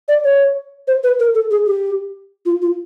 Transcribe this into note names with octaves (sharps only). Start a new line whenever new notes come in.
D5
C#5
C5
B4
A#4
A4
G#4
G4
F4
F4